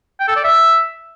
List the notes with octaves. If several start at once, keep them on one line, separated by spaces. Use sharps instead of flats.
G5
A4
D5
E5